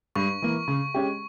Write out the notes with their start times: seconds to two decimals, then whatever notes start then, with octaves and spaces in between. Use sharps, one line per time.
0.15 G2 C#6
0.42 E3 A#3
0.68 C#3
0.94 G#3 C#4 G4